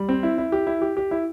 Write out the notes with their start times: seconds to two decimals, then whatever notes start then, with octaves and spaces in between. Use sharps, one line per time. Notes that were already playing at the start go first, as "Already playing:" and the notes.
Already playing: G3
0.09 C4
0.23 E4
0.38 E4
0.52 G4
0.67 E4
0.82 G4
0.97 G4
1.11 E4